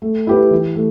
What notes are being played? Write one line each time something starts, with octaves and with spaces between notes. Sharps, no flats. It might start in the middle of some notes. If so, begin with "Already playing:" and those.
A3
E4 G4 B4
E3
A3